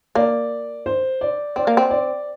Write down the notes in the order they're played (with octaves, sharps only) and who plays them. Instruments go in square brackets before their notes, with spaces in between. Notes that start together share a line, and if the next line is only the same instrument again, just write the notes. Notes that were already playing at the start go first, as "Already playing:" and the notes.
[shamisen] A#3 [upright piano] D5
[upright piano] C5
D5
[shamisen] C4 [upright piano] D5
[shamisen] A#3
C4
[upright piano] D5